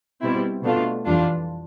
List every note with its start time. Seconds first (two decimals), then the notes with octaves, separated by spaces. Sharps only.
0.22 B2 G3 C4 E4
0.64 B2 A3 D4 F4
1.06 F2 E3 G3 D4 F4